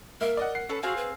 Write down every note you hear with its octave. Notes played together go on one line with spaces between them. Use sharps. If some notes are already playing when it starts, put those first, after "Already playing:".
A#3 A#4 E5
D5 D#5 F#5
F#5 C7
C#4 A4 B4
C4 F#4 G#4 F5
B4